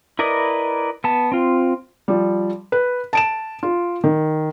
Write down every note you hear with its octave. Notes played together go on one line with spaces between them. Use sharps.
E4 A#4 B4 D5 D#5
B3 A5
C4 F4
F3 G3
B4
A5 D7 E7
F4
D#3